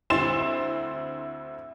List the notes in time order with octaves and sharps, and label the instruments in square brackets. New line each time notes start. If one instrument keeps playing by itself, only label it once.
[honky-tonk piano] D2 C4 E4 C6 A6 E7